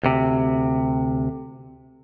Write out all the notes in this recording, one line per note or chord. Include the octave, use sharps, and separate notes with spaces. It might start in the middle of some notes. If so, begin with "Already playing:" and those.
D2 C3